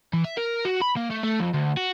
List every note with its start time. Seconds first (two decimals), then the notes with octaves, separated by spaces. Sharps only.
0.13 E3
0.24 E5
0.37 A#4
0.65 F#4
0.82 B5
0.96 A#3
1.10 A3
1.23 A3
1.40 F2
1.54 D2
1.77 F#4